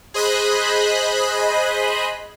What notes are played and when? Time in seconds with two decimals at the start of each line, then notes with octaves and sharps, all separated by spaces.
0.14 G#4 C5 D#5 B5 F#6